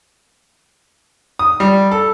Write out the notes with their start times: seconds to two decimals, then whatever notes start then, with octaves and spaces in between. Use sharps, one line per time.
1.39 D#6
1.60 G3
1.91 A4